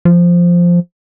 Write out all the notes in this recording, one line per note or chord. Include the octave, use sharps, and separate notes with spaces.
F3